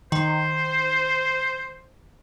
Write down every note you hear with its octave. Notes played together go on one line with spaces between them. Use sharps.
D#3 C5